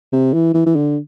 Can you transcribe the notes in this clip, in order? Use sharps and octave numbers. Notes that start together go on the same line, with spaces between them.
C3
E3
E3
E3
D3